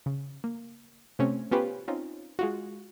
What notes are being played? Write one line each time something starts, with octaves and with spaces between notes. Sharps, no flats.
C#3
A#3
C3 A3 C4 C#4
B3 C#4 F4 G4 B4 C5
C4 C#4 D#4 F4
G#3 F4 F#4